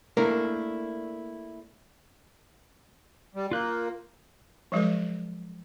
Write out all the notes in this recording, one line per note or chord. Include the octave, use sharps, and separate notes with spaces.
A3 A#3 D4 E4 A#4
G3
A#3 F4 F#6 G6
F3 F#3 G#3 G4 A4 B4